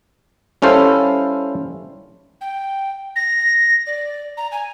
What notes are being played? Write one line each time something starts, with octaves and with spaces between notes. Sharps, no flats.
G3 C#4 E4 A4 C5 F5
G5
A#6
D5
A#5
G#5